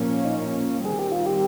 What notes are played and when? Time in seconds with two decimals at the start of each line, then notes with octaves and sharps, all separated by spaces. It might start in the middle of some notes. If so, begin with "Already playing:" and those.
Already playing: A#2 F3 A#3 C#4
0.25 D#4
0.85 D#3 G3 C4 G#4
0.99 G4
1.12 F4
1.26 G4